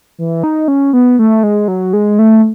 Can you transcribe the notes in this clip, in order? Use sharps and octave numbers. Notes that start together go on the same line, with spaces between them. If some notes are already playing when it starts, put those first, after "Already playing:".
E3
D#4
C#4
B3
A3
G#3
F#3
G#3
A3